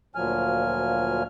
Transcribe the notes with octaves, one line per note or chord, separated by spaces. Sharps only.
D2 A#2 F3 F#3 G#5 F6